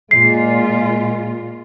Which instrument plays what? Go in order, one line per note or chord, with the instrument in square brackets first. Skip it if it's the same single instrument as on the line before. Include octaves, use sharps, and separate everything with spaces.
[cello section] A#2 F4 [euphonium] G#3 [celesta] C7